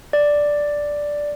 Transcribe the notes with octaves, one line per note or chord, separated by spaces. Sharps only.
D5